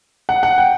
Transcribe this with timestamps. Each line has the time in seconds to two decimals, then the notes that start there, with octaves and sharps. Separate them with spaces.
0.29 F#5
0.43 F#5
0.58 G5